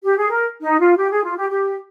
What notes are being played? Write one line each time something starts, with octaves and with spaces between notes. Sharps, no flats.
G4
G#4
A#4
D#4
F4
G4
G#4
F4
G4
G4